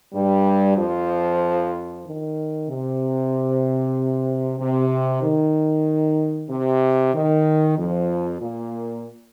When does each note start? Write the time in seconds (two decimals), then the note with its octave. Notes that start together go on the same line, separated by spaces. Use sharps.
0.14 G2 G3
0.78 F2 F3
2.05 D#3
2.69 C3
4.60 C3
5.23 D#3
6.50 C3
7.14 D#3
7.78 F2 F3
8.40 A#2 A#3